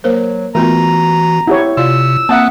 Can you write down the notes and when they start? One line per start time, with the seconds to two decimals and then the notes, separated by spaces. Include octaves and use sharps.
0.04 F#3 A#3 A#4 C5
0.55 E3 A3 B3 F4 F#4 A#4 A#5
1.47 E4 G4 C#5
1.77 C3 F4 D5 F5 E6
2.29 A#3 C4 E5 F#5 A5 A#5 D#6 F#6